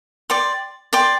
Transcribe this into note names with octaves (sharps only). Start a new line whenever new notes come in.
D5 G5 C6
D5 G5 C6